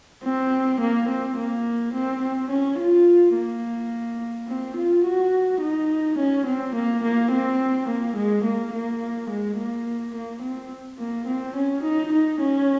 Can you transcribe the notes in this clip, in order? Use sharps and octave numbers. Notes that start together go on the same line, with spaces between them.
C4
A#3
C4
A#3
C4
C4
C#4
F4
A#3
C4
F4
F#4
D#4
C#4
C4
A#3
A#3
C4
A#3
G#3
A#3
A#3
G#3
A#3
A#3
C4
A#3
C4
C#4
D#4
D#4
C#4